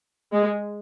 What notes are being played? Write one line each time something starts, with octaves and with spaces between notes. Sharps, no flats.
G#3 G#4